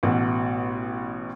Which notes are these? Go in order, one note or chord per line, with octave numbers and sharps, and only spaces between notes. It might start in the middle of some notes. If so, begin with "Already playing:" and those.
A1 B2